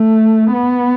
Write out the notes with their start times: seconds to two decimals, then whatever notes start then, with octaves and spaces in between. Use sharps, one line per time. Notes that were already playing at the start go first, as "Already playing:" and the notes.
Already playing: A3
0.53 B3